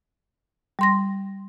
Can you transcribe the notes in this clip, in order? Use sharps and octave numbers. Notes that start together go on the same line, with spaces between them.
G3 C6 A#6